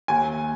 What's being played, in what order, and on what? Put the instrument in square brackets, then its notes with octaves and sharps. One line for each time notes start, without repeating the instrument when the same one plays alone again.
[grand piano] D#2 G#5